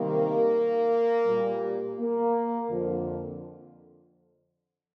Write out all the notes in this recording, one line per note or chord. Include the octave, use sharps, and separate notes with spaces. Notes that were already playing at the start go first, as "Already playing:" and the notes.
Already playing: C3 D#3 G3 A#3
A#2 G3
A#3
F2 D3 F3